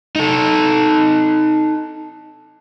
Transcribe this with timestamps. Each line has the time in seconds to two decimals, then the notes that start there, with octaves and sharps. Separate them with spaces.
0.16 D#4 A4